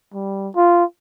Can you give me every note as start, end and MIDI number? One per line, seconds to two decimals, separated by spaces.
0.14 0.49 55
0.56 0.84 65